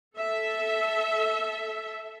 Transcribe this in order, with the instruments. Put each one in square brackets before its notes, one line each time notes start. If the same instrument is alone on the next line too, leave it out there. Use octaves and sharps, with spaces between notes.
[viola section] A4 E5